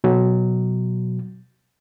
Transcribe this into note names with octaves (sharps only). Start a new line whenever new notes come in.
B2 F#3